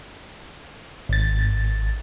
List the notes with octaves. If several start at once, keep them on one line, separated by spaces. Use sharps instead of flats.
G#1 A6